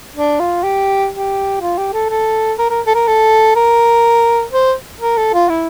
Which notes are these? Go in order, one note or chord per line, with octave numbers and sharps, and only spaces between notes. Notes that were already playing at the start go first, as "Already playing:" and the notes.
D4
F4
G4
G4
F4
G4
A4
A4
A#4
A#4
A4
A#4
A4
A#4
C5
A#4
A4
F4
E4